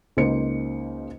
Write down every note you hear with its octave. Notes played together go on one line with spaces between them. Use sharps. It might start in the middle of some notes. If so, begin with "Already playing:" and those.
C#2 C#3 A#3 D#4 C5 C#7